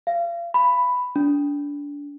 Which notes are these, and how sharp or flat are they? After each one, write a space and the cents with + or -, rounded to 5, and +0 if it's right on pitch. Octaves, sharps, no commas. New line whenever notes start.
F5 -35
B5 +5
D4 -25